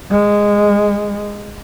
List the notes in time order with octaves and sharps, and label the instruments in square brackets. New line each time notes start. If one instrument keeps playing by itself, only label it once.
[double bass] G#3